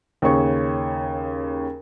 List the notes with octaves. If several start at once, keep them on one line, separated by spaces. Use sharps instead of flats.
D#2 C#3 C#5 C#6